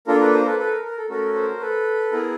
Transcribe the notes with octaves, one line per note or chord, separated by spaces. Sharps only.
A#3 D4 F4 A4 A#4
A4 B4
A#4 C5
A4 B4
A4 B4
A#4
A#4
A4
A3 C#4 F#4 A4 A#4
A#4 C5
A4 B4
B3 E4 G#4 A#4